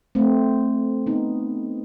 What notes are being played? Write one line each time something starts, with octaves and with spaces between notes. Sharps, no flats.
A3 C4
B3 D#4